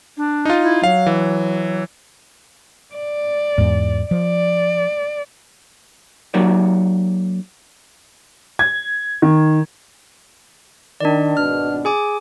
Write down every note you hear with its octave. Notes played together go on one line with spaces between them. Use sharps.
D4
D#4 F4
E4
F#3 F5
E3
D5
E2 G#2
F3 D5
F#3 A#3 D#4 G4 C#5 D5
G#6
D#3
D#3 D4 D5
G#1 B2 D4 F6
G#4 G#5 D6